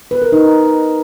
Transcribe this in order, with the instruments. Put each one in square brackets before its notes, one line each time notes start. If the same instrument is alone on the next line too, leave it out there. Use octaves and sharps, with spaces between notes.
[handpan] B4
A#4
D#4